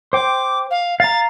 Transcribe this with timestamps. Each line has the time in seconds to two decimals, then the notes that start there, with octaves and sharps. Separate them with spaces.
0.13 C5 G5 D6
0.71 F5
1.00 F5 A#5 A6